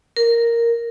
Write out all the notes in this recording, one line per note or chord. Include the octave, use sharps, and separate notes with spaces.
A#4